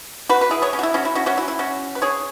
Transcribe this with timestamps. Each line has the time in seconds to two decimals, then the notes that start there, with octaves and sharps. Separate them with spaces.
0.29 F#4 B4
0.41 B4
0.51 E4 G#4
0.62 G#4 C#5
0.73 C#4
0.79 F#4
0.83 E4
0.94 C#4 F#4
1.05 E4
1.15 C#4 F#4
1.26 C#4 F#4
1.38 E4
1.48 E4
1.59 C#4 F#4
1.95 B4
2.02 G#4 C#5